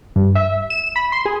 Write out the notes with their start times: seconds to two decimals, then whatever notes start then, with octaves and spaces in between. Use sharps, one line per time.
0.16 G2
0.35 E5
0.70 E7
0.96 B5
1.12 C6
1.25 G#4